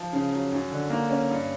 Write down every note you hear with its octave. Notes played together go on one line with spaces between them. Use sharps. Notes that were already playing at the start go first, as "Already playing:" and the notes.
Already playing: F3
C#3
F#3
F#2
D3
A#3
C#4
G2